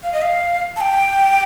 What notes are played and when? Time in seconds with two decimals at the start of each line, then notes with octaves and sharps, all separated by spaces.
0.03 F5
0.13 D#5
0.22 F5
0.76 A5
0.81 G5